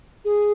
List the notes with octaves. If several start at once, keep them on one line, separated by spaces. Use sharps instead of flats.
G#4